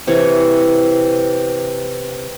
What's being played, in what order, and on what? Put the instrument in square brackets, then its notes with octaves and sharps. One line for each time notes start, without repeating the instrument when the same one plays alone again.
[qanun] C3 E3 C#5